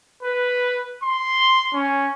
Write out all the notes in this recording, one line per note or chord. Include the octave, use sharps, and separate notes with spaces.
B4
C6
C#4